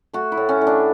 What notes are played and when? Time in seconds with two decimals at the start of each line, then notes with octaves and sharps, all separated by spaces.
0.13 A3 F#4
0.32 E4
0.37 A2
0.49 C#4
0.61 A2
0.67 D4